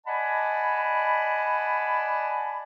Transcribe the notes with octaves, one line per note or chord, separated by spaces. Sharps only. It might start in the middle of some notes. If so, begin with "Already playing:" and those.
D5 D#5 F#5 G#5 A5 B5